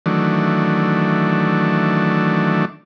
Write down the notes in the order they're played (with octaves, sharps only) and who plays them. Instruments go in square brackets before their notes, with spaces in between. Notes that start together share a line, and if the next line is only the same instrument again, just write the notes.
[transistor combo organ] D#3 E3 F#3 A3 D4